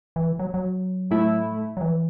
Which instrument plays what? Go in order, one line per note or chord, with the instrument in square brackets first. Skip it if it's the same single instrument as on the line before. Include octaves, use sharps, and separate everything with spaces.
[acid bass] E3
F#3
F#3
[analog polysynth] A2 A3 E4
[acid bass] F#3
E3